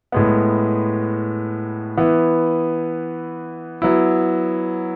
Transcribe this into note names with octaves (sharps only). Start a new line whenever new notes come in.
A2 G#3 B3
E3 B3 E4
F#3 B3 E4